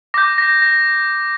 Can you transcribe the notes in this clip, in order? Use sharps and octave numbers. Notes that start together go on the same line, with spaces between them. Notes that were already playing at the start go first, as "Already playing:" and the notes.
D6 G6 A#6
A#6
A#6